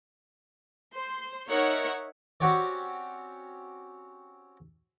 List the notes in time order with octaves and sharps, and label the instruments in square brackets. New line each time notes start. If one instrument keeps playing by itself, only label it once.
[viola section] C5 C6
D#4 A#4 C#5 E5 F#5
[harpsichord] C4 C#4 F#4 G4 C#5 D5